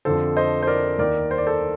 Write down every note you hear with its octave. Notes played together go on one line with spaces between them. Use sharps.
F2 D3 F3 A4 C5
C5 D#5
C5
A#4 D5
D#2 D#3 A#4 D5
C5
D5
A4 C5